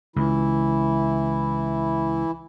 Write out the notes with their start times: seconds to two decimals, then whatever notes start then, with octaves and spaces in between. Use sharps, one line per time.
0.16 C#2 E3 E4